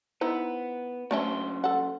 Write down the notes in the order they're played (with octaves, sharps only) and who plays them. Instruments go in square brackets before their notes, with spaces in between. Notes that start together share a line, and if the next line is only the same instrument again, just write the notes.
[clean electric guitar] B3 [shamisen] D#4 E4 C5
[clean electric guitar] C#3 F#3 C5 [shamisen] A3 C#4 E5
[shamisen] A4 F#5